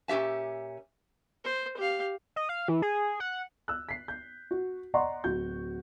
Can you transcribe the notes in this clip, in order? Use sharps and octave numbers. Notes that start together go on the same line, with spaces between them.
A#2 C#4 G4 E5 A5
C5
G4 F5
D#5
F5
E3
G#4
F#5
E6 F#6
B6 C7
G6
F#4
D5 D#5 F#5 A#5 C6 C#6
D1 F#4 G6